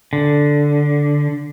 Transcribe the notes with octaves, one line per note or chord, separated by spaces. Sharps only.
D3